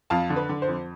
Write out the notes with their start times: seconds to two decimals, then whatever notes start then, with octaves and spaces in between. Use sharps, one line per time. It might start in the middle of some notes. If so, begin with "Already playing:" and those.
0.10 F2 F5 A5
0.30 D3
0.36 B4
0.49 D3
0.62 C5
0.68 F2